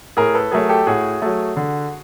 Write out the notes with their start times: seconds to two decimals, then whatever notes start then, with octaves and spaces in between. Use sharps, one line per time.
0.17 A2 G#4 A#4
0.34 A4 B4
0.52 F#3 A3 G#4 A#4
0.69 G4 A4
0.87 A2 F#4 G#4
1.22 F#3 A3
1.57 D3